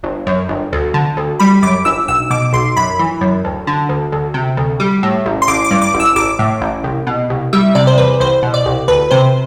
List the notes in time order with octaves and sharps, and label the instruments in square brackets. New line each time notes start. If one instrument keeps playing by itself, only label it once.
[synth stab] G1
F#2
G1
D2
D3
D2
G3 B5
F#2 D6
G1 E6
B1 E6
B2 D6
B1 C6
F#2 B5
E3
F#2
D2
D3
D2
D2
C3
D2
G3
A2
A1
C6
A1 D6
D6
G2
D6
A1
E6
A1 D6
A2
A1
C2
B2
C2
G3 E5
C3 D5
C5
E2 B4
C2 C5
B2
D5
C2
D2 B4
C3 C5